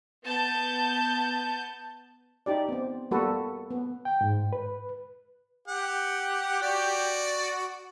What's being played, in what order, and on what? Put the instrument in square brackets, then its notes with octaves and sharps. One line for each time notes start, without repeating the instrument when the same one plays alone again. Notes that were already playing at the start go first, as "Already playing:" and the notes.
[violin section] B3 A5 G6
[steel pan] D#4 G4 D5
B3 C4
G3 A#3 B3 F#4 A4 B4
B3
[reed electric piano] G5
G#2
B4
[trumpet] G4 [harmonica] F#5
[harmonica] F#4 D5